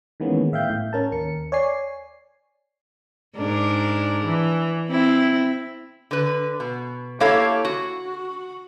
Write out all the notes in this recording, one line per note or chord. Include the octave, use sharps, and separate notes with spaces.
D#3 E3 G#3 A#3 B3 C#4
A2 E5 F5 G5 G6
A2
C#4 A#4 A5
D#2 A#4 C#7
C#5 D5 G#5 C7
G#2 D4 A#4
E3
C4 E4
D3 B4
B2
A#3 E4 G4 A4 C#5 F5
F#4